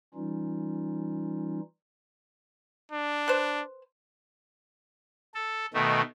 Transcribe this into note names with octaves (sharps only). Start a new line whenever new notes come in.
E3 G3 C#4 D#4 F4
D4
B4 C5
A4
B2 D#3 A3